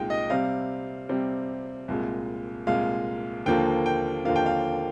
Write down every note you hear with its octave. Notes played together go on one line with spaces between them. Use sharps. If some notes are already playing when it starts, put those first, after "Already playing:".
Already playing: C2 A#2 G#3 D#4 G5
D#5
C3 G3 C4 F5
C3 G3 C4
C2 A#2 G#3
C2 A#2 G#3 F5
D#2 D3 F3 A#3 G5
G5
D#2 D3 F3 A#3 F5
G5
F5